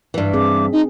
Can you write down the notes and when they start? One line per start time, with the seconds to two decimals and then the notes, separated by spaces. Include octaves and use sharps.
0.14 G2 E3
0.33 C4 G#4 D6
0.73 D#4 D#5